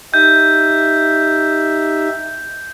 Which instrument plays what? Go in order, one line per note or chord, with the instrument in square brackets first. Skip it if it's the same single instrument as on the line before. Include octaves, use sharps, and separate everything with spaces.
[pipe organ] D#4 G4 E5 [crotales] G6